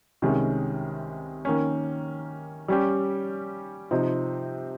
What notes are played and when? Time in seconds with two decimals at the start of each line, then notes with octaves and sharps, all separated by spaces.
0.22 C2 C3 D#3 G#3 C#4
1.45 D#3 A#3 C#4
2.68 G3 C#4 G4
3.91 C3 F3 C4 D#4